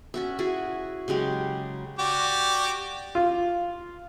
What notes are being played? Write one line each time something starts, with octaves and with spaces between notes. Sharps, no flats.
C#4 F#4 E5
E4 F#4 G#4
C#3 F#3 G#3 G4
F#4 G4 D5
F4